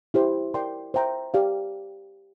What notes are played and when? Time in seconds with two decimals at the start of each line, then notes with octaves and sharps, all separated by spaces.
0.14 E4 G4 C5
0.54 A#4 D5 G5 C6
0.94 C5 E5 G5 A#5
1.34 G4 D5 F5